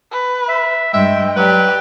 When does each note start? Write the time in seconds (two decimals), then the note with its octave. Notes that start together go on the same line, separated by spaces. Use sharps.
0.12 B4
0.48 E5
0.94 G2 G#3 E5 G5
1.37 F#3 G4 B4 D5